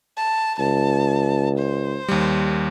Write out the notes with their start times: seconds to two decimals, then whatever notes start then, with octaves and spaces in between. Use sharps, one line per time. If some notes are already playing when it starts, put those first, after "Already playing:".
0.17 A5
0.59 C#2 A5
1.58 C5
2.08 D#2 G3